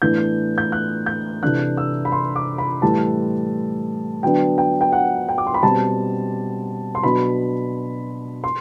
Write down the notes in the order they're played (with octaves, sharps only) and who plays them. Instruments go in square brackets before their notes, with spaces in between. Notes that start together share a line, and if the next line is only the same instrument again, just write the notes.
[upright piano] A2 E3 B3 D4 G6
G6
F#6
G6
C3 E3 A3 D4 F#6
E6
B5
C6
D6
B5
A2 E3 G3 A5
D3 F#3 B3 D4 G5
G5
G5
F#5
G5
D6
C6
B5
B2 G3 C4 A5
C6
B2 F#3 B3 D4 B5
C6